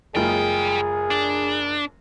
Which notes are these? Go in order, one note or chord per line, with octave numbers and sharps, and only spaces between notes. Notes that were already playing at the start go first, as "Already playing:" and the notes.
F#1 G3 G#3 F4 G#4 G5
D4